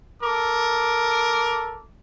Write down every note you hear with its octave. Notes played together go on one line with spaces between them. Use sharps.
A4 A#4 D6